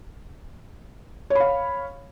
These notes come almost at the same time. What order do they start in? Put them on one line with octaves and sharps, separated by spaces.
C#5 B5 F5